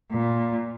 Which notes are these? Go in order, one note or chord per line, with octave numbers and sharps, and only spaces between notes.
A#2